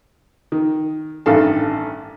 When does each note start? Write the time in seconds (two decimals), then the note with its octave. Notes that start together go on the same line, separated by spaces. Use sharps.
0.52 D#3
1.26 A1 G2 D#3 A4 F5 A5